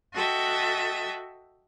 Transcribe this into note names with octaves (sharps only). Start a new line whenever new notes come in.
F#4 A4 D#5 E5 G5